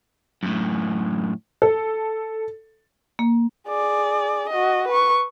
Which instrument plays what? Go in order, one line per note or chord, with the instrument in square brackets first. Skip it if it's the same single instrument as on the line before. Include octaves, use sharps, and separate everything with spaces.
[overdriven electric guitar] F#2 A2
[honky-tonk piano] A4
[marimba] A#3
[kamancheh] G#4 D5
F#4 D#5
B4 C#6